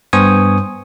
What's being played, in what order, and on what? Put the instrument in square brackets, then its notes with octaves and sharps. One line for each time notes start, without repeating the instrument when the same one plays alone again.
[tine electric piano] G2 B3 C5 G#5 C#6 D#6